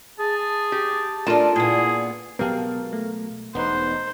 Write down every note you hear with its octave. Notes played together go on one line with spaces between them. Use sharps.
G#4 A5
G4
A3 D4 F4 A#4 A5
A#2 B3 E4 G#4
B2 F#3 G#3 B3 G4 A#4 F5 A5
A3
E1 B3 D#4 B4 C5